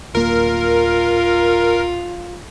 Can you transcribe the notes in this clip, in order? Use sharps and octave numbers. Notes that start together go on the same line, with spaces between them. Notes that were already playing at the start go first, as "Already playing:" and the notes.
D1 A#3 F4 A#4